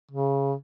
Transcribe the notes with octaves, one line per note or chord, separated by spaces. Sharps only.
C#3